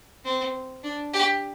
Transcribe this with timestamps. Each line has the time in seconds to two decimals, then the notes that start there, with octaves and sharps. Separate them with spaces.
0.25 C4
0.83 D4
1.13 G4